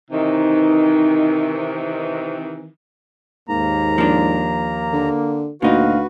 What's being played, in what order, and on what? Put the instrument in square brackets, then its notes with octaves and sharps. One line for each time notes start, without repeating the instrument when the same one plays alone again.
[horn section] C3 D#3 E3 [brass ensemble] D#4
[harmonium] D#2 A#5 [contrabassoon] G#2 [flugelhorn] A#3
[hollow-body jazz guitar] F3 D4 [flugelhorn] A#3
[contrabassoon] D3
[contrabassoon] D2 [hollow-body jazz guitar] A#2 D#4 [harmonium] F#4 B4 [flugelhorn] F5